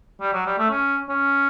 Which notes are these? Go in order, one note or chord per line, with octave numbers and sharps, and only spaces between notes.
G3
F#3
G3
A3
C#4
C#4